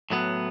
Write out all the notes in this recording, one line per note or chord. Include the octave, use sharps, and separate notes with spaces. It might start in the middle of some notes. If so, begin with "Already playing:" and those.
A2 F#3 B3